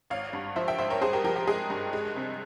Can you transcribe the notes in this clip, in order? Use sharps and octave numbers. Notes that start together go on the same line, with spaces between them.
G#1 C#5 F5
G2
F3 C5 E5
E5 G5
G#1 C5 E5
A#4 C#5
G2 G#4 C5
G4 A#4
F3 G4 A#4
G4
G#3 G#4
G2
G#3
C3